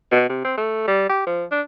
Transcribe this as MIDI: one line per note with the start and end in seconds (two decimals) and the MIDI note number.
0.11 0.27 47
0.29 0.41 48
0.44 0.55 60
0.58 0.85 57
0.87 1.05 55
1.09 1.23 67
1.27 1.45 53
1.52 1.62 62